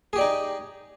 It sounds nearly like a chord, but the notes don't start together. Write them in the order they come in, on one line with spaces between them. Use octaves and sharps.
G#4 G4 D5 D#4